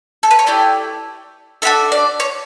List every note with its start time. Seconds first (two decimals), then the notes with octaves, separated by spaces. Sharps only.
0.23 A4
0.31 B4
0.39 C#5
0.46 A3 E4 G4 D5
1.62 D4 F#4 A4 E5
1.92 D5
2.20 C#5